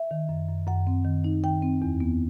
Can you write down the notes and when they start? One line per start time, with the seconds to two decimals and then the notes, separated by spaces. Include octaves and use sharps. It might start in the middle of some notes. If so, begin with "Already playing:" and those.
Already playing: E5
0.11 D#3
0.29 F#2
0.48 F#2
0.67 F#2 F#5
0.87 C4
1.05 D#3
1.24 D#4
1.44 D#3 G5
1.63 C4
1.82 E2
2.00 B3